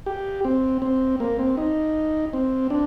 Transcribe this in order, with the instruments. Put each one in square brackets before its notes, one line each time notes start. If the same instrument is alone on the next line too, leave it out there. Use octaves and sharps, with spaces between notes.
[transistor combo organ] G4
C4
C4
A#3
C4
D#4
C4
D4